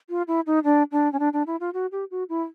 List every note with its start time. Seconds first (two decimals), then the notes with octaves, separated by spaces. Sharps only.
0.09 F4
0.28 E4
0.47 D#4
0.64 D4
0.92 D4
1.13 C#4
1.19 D4
1.33 D4
1.47 E4
1.60 F4
1.74 F#4
1.92 G4
2.11 F#4
2.29 E4